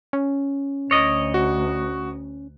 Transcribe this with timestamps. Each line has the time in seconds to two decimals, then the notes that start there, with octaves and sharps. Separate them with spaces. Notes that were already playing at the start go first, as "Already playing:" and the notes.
0.13 C#4
0.91 D2 C#5 D#5
1.34 F#4